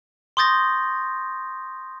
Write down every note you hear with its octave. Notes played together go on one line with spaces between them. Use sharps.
C6 C#6 D#6 G6 A6 A#6